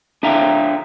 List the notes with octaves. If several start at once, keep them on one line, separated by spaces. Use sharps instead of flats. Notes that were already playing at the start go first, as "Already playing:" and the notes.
D4 E5 F5 G5 A#5